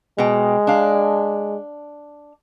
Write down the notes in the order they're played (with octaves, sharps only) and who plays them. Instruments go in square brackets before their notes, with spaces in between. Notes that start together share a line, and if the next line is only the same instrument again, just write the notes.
[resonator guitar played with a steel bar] B2 G5 [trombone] G#3
[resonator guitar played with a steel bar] D4 F5